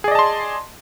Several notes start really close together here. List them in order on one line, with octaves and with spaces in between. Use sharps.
G#4 D5 D#5 A5 C6